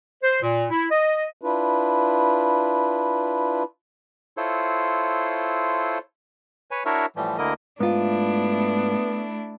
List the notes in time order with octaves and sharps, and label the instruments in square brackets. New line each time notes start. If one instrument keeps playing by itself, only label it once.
[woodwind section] C5
A#2
E4
D#5
[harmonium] D4 E4 F4 B4
[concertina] E4 F4 A4 C5 C#5
[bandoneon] B4 C#5 G#5
D4 E4 F#4 A#4 C#5 E5
A2 E3 F3 G3
D2 D3 A#3 E4 A#4 D#5
[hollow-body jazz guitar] G#2 F4 [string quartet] A3 D4 E4 [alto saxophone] B3